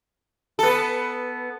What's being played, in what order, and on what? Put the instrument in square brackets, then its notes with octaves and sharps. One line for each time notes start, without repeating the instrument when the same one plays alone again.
[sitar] B3 A4